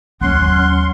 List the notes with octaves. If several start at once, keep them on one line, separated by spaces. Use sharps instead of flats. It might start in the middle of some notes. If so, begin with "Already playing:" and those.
D#2 F#3 C#4 F#5 C6